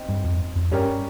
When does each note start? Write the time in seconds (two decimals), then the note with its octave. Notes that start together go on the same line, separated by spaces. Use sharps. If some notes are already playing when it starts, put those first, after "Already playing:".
Already playing: C4 D#4
0.09 G2
0.24 F2
0.56 F2
0.71 G2 G3 C#4 G4 A#4